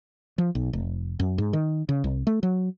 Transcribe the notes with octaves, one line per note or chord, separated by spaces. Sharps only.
F3
B1
F1
F#2
G#2
D#3
C#3
C2
A3
F#3